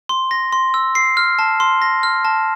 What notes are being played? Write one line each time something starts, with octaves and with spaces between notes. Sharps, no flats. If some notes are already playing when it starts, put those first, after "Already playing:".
C6
A#6
C6
E6
C7
F6
A5
C6
A#6
F6
A5